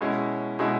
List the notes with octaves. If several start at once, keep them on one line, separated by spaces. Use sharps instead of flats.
B2 G#3 C#4 E4
B2 G#3 C#4 E4